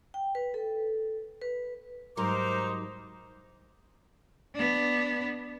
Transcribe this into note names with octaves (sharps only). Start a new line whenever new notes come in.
G5
B4
A4
B4
G#2 F#3 G3 D#4 A#4 C5 A#5 D6
B3 D4